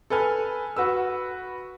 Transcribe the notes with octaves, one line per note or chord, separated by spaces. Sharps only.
A4 B4 G#5 F6
F#4 B4 E6